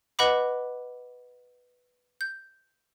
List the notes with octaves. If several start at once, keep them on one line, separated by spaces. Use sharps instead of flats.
B4 D#5 F#5 B5 D6
G6